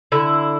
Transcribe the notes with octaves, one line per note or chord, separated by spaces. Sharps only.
D3 E4